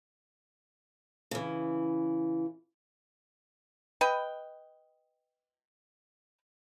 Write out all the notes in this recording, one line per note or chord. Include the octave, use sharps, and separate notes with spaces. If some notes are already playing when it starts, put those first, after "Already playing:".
C#3 E3
B4 D#5 G5